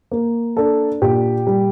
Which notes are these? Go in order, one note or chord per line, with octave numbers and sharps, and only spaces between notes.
A#3
D4 A4
A#2 G4
G3